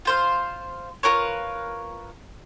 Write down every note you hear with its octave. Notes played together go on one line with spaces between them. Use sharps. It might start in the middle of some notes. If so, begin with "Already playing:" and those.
F4 C5 F5
F4 A#4 B4 C#5